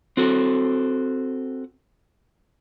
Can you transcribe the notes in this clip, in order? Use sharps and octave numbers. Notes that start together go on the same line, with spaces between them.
C4 F#4 A4